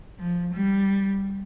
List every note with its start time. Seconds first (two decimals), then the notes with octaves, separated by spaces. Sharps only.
0.18 F3
0.54 G3